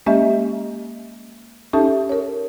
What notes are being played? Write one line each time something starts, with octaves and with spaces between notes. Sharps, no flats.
G#3 A#3 C#4 G4 D#5 E5
C#4 D#4 G4 A4 E5 A5
A#4 C#5